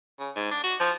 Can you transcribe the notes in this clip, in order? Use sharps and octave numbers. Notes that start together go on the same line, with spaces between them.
C#3
G#2
D4
F#4
F3